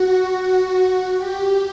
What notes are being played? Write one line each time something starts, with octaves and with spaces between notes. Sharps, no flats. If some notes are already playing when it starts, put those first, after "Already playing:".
Already playing: F#4
G4